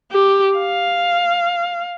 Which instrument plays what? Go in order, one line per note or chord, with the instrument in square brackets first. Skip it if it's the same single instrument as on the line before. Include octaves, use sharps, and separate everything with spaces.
[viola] G4
F5